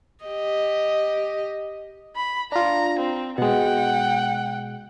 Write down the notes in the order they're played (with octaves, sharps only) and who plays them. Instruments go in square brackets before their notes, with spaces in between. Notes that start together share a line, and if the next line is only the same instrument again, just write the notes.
[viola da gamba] G4 D#5
[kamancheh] B5
[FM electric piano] D4 F4 [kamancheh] A#5
[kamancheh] C4
[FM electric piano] B2 G#3 [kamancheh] F#5 G5